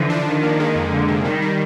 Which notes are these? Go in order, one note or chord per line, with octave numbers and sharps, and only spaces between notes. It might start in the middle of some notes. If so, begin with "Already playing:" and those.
Already playing: D3 E3 F3
D4
D#3 D4
A#3
G#3
F2
F2 D3
C3
D#3 G3
G3